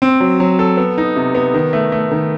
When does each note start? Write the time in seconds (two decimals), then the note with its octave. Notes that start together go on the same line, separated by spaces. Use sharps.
0.02 C4
0.20 F#3
0.40 F#3
0.59 A4
0.77 B3
0.98 D#4
1.16 C3
1.35 B3
1.54 D#3
1.73 A3
1.92 A3
2.12 D#3